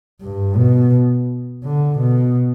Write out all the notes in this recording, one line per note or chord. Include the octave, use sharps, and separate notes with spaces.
G2
B2
D3
B2